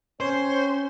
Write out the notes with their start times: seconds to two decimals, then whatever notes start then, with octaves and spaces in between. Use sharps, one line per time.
0.20 C4 C#4 C5 C#5